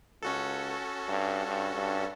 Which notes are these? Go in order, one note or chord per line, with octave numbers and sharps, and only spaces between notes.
C#2 C#4 F#4 A4
G2
G2
G2